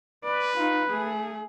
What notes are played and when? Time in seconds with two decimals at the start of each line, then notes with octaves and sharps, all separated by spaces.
0.24 B4 D5
0.57 D#4 F4
0.90 A3 G#4